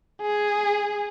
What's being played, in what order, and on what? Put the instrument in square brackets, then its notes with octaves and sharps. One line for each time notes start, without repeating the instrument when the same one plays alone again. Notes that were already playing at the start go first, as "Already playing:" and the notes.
[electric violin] G#4